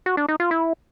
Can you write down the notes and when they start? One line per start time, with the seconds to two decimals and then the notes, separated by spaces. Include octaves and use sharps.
0.06 F#4
0.17 D4
0.29 D#4
0.40 F4
0.51 E4